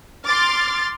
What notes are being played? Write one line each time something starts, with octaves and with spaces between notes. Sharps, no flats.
C6 D6 F6 A6